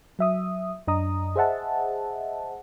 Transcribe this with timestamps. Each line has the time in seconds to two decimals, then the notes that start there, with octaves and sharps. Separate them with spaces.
0.19 F#3 E5 D#6
0.87 F#2 D4 D#5 A#5 D#6
1.36 G#4 C5 D#5 E5 F#5 A5